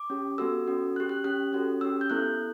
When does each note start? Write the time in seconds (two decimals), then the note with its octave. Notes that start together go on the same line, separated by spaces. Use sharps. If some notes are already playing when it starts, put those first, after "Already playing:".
Already playing: D6
0.10 C#4 G4
0.38 B3 F#4 A4 E6
0.66 C#4 F#4 A4
0.96 C#4 G4 F#6
1.09 F#6
1.24 C#4 G4 F#6
1.53 C#4 F#4 A4
1.81 C#4 G4 E6
2.01 G6
2.10 B3 E4 A4 F#6